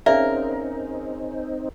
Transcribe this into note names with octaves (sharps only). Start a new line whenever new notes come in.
C4 C#4 D#4 G#4 A#4 D5 E5 F5